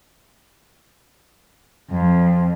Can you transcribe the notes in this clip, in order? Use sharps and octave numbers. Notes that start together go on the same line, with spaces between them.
F2